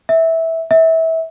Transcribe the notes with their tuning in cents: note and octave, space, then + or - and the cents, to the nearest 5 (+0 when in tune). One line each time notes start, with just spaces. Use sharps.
E5 -15
E5 -25